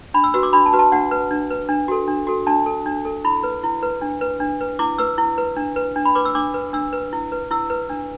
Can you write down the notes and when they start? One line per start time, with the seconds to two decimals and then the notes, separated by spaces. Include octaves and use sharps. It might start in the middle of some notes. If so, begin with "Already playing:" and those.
0.14 D4 B5
0.24 E6
0.34 F#4 B4 E6
0.43 D6
0.53 D4 B5
0.66 A5
0.73 F#4 B4
0.79 A5
0.92 D4 F#5
1.11 B4
1.31 D4
1.51 B4
1.69 D4
1.88 F#4 A4
2.08 D4
2.27 F#4 A4
2.47 D4 A5
2.66 A4
2.86 D4
3.05 A4
3.25 E4 B5
3.44 B4
3.64 E4
3.83 B4
4.01 D4
4.21 B4
4.40 D4
4.61 B4
4.79 E4 D6
4.98 B4 E6
5.18 E4
5.38 B4
5.57 D4
5.76 B4
5.96 D4
6.05 B5
6.15 B4 D6
6.25 E6
6.35 D4 D6
6.54 B4
6.73 D4 E6
6.93 B4
7.13 E4
7.32 B4
7.51 E4 E6
7.70 B4
7.90 D4